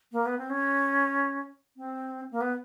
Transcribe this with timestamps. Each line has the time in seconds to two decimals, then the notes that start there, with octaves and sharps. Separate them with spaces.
0.12 A#3
0.26 B3
0.38 C4
0.50 C#4
1.77 C4
2.31 A#3
2.41 B3